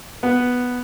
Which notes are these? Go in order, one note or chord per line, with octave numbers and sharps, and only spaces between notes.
B3